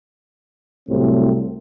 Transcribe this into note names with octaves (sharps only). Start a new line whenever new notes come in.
C2 A2 C3 F#3 A3 C4